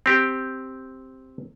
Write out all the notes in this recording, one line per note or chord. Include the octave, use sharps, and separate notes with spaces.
C4 G4